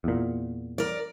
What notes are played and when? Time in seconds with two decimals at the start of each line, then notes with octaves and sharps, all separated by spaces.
0.04 E2 A#2
0.78 A#4 D5